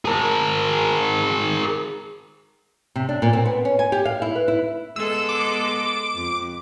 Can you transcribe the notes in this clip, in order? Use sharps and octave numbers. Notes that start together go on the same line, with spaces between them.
G#4 A#4
C3
D4
A#2
C4
B3
C#4
G#5
G4
F5
E4
B4
E4
G#3 B3 A4 E6
D6
F2